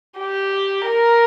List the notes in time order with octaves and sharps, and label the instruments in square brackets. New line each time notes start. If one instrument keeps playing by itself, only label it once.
[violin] G4
A#4